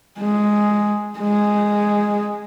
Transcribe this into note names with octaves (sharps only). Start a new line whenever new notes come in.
G#3
G#3